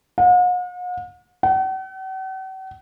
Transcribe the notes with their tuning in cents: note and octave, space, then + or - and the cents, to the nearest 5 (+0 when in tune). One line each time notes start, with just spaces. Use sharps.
F#5 -45
F#5 +45